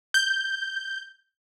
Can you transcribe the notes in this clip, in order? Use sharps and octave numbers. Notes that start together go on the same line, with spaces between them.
G6